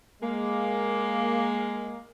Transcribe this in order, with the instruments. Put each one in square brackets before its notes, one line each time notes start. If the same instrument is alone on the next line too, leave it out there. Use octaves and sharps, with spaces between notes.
[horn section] G#3 A#3